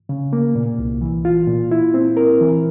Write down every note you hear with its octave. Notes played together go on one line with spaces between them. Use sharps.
C#3
A#3
A#2
C2
E3
F4
A#2
E4
C4
A#4
E3